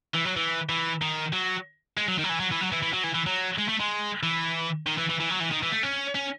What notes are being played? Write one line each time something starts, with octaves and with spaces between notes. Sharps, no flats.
E3
F#3
E3
E3
D#3
F#3
G#3
F#3
D#3
F#3
E3
F#3
E3
F#3
E3
E3
F#3
E3
E3
F#3
G#3
A3
G#3
E3
D#3
E3
E3
E3
F#3
E3
D#3
E3
A3
C#4
C#4